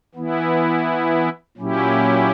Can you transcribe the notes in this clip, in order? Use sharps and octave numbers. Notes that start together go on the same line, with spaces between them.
E3 B3 E4
A#2 F#3 C#4 E4 G4